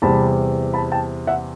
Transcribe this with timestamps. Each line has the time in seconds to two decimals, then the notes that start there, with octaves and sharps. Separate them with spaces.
0.02 E2 C3 E3 G3 A5 B5
0.74 A5 B5
0.92 G5 A5
1.27 E5 F#5